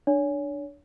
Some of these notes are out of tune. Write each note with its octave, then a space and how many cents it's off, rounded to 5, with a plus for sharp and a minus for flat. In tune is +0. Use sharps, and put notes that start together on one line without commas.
D4 +10 C#5 +30